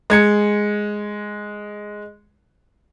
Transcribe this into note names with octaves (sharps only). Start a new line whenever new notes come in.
G#3 G#6 C#7